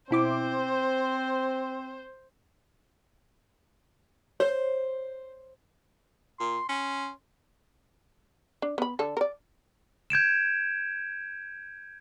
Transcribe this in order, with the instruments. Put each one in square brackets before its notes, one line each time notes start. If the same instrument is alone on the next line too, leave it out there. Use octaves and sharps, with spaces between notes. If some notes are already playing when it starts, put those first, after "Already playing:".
[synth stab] B2 E4 D6 [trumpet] C4 [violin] C5
[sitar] C5 [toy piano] C#5
[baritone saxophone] A#2 [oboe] C6
[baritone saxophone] C#4 [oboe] C6
[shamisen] D4
B3 B5
D3 A4
A#4 D5
[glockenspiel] G6 G#6 D7 E7